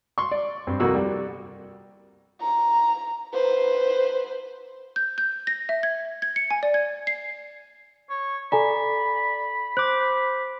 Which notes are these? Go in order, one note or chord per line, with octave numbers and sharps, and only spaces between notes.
C6 C#6
D5
G2 C4
C2 F2 A#3 F#4 E6
G3
A#5
B4 C5
G6
G6
A#6
E5
G#6
G#6
C#7
G#5
D5
G#6
C7
C#5
A4 D5 G#5 A#5 B5
C5 D6 F#6